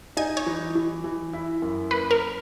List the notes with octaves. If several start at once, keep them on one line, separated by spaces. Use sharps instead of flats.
D#4 G#5
C#5
E3
E3
E3
E4
F#2
A#3 B4
A#4